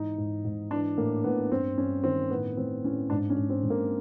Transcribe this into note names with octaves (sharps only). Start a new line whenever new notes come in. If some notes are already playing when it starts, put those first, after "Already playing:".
Already playing: G#2 E3 D#4
G#2
G#2
E3 D4
A2 A#3
A2 B3
G2 C4
G2 C#4
D#3 C4
A2 B3
A2 C4
A2 C#4
G#2 D4
C#4
G#2
C4
G#2
A#3